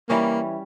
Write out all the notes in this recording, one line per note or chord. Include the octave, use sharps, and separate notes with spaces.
E3 G3 A#3 C#4